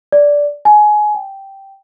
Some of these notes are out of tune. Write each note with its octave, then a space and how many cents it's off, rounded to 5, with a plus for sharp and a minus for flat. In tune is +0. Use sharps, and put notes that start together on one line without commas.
D5 -10
G#5 +20
G5 -5